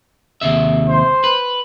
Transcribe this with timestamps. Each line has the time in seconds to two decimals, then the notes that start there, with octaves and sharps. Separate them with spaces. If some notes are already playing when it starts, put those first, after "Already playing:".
0.41 D#2 C3 E5
0.88 C5
1.24 B4